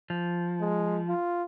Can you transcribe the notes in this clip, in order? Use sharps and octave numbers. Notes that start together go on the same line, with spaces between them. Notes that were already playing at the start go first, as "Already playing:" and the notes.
F3
G#3
F4